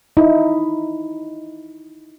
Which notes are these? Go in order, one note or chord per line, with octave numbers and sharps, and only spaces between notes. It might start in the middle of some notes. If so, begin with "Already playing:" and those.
D#4 E4